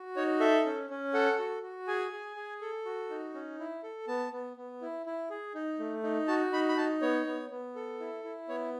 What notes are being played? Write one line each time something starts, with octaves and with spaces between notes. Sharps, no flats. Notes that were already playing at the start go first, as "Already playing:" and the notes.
Already playing: F#4
D#4 C#5
A4 E5
C#4
C#4
A4 F#5
F#4
F#4
G#4 G#5
G#4
G#4
A4
F#4
D#4
C#4
E4
A4
B3 A5
B3
B3
E4
E4
G#4
D#4
A3
D#4
F#4 A5
D#4 B5
B5
D#4 A5
B3 C#5
B3
B3
A4
E4
E4
B3 C#5